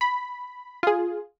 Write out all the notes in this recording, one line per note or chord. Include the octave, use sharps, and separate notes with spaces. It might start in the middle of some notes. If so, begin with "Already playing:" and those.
B5
F4 G#4